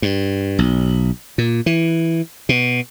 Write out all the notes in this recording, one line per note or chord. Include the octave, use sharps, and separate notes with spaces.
G2
B1
A#2
E3
B2